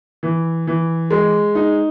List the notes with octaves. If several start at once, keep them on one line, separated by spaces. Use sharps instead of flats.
E3
E3
G#3
D#4